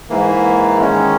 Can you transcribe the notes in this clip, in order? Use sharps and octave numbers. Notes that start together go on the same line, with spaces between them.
G#2 E3 A#3
D#3 G#3 C#4